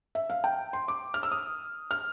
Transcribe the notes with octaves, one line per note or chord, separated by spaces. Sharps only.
E5
F5
G5
C6
D6
F6
E6
D#6
F6